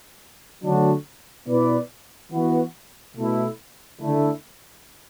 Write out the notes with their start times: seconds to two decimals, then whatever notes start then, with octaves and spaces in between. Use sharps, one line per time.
0.62 D3 F#3 A3 D4 F#4
1.46 B2 B3 E4 B4 D5
2.31 E3 B3 F#4
3.16 B2 A3 E4
4.00 D3 A3 E4